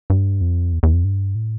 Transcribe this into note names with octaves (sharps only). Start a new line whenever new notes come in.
G2
F2
E2
E2
F2
G2
A2